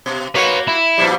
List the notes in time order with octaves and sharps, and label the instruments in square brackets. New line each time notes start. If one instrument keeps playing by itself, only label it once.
[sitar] B2
[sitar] A#3 F#4 [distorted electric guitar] B4 C#5
[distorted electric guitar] E4
[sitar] A#2 F3 G3